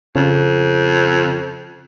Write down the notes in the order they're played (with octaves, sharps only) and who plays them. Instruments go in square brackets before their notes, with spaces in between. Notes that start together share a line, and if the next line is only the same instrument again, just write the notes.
[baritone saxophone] F2 [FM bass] C#3